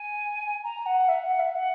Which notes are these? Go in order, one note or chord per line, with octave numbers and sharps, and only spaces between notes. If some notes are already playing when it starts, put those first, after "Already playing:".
Already playing: G#5
A#5
F#5
E5
F#5
E5
F#5